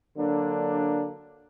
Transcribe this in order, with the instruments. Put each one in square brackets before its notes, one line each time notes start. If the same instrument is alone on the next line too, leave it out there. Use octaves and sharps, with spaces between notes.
[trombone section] D3 F#3 A#3 D4